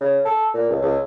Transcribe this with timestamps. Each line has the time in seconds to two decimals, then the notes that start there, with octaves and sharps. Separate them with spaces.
0.01 C#3
0.25 A4
0.54 A#2
0.69 C#2
0.82 C#2